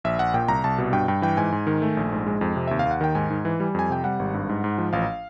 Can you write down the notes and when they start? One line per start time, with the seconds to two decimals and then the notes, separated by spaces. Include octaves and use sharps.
0.04 A#1 E5
0.19 A#1 F#5
0.34 A#2 G5
0.48 C2 A#5
0.64 C2 A5
0.78 B2
0.93 G2 G5
1.08 G2 G5
1.22 E3 G5
1.37 G#2 G#5
1.52 G#2
1.67 D#3
1.82 A3
1.97 A#1
2.12 G#2
2.27 G#3
2.41 F2
2.56 C3
2.68 D#2 E5
2.79 F5
2.85 D#2
2.91 F#5
3.01 D#3 G5
3.15 G#2 G#5
3.30 G#2
3.45 E3
3.60 G3
3.75 F2 G#5
3.90 C3 G5
4.04 G3 F#5
4.19 G#1
4.34 G2
4.49 G#2
4.64 G#2
4.78 F3
4.93 A1 F5